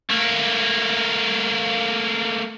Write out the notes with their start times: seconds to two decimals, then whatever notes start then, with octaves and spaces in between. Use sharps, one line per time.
0.10 A3 A#3